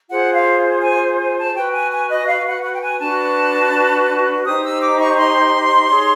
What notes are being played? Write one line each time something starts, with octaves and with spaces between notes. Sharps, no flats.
F4 G#4 C5 F#5
F5
G#5
G#5
A5
F#4 B4 G5
G#5
G#5
D#5
F5
F#5
F#5
G5
G#5
D4 F#4 B4 A5
D#4 G4 C5 D#6
E6
D6
C#6
C6
D#4 G#4 C#5